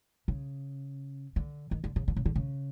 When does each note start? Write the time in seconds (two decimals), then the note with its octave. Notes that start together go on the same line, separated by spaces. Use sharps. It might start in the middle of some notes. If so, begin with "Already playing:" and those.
0.28 C#3
1.36 D3
1.71 D#3
1.84 D3
1.96 C#3
2.08 D3
2.17 C#3
2.26 D3
2.36 C#3